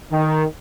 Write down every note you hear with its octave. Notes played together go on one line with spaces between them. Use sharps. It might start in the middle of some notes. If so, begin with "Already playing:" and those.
D#3